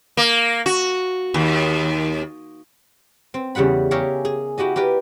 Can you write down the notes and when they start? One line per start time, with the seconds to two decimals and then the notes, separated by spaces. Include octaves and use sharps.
0.17 A#3
0.66 F#4
1.34 D#2
3.34 C4
3.55 E2 C#3 G3 F#5 B5
3.91 G4 G#4 A#4 C#5 E5 F5
4.25 G#4
4.58 E4 F#4 G4 D#5
4.76 G4 A#4 B4 D5